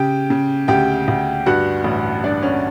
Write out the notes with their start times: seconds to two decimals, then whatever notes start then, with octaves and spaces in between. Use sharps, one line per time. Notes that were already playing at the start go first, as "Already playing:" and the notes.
Already playing: C#3 G4 G5
0.30 C#3
0.68 D2 G4 G5
1.08 D2
1.46 G2 F#4 F#5
1.84 A1
2.23 G2 D4 D5
2.43 C#4 C#5